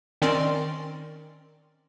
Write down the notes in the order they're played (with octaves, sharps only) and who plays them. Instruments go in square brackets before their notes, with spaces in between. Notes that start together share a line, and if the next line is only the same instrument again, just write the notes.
[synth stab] D#3 C4 C#4 A#4 D5 C6